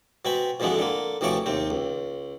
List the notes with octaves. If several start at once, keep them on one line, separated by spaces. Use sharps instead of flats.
B2 C4 G#5 B5
F2 B2 D3 E3 G#3 B3
D3 A#3
D2 C3 E3 F3 C#5 D5
D#2 C3 C4
C#2